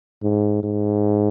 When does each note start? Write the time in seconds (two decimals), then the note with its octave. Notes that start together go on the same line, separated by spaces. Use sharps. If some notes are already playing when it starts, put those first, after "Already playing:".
0.23 G#2
0.63 G#2